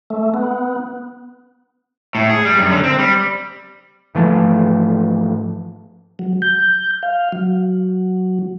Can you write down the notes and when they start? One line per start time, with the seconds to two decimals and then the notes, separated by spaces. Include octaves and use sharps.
0.10 A3
0.34 B3
2.15 A2
2.30 G#4
2.45 G3
2.59 F#2
2.71 D3
2.84 C4
2.99 G3
4.15 G#2 E3 F3 A3
6.19 F#3
6.42 G6
7.03 F5
7.32 F#3